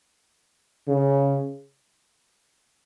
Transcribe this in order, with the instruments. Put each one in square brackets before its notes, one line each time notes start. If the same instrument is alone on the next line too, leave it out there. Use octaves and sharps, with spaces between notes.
[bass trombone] C#3